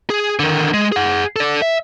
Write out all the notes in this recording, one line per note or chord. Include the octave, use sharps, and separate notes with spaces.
G#4
D3 D#3
G#3
G#4 F#5
A4 D5
E5